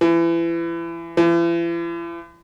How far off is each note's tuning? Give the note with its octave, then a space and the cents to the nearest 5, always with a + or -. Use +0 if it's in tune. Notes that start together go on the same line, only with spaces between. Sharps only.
E3 +30
E3 +45